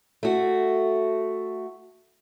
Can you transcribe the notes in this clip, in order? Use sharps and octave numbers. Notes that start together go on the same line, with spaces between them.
A3 F#4